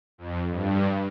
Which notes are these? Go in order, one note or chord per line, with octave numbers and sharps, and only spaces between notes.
F2
G2